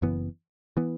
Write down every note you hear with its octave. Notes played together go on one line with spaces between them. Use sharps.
F#1 F#2 E3 B3
E3 B3